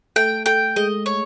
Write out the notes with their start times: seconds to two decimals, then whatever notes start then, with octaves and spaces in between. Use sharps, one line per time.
0.16 A3 G5
0.46 A3 G5
0.76 G#3 D#5
1.06 C#5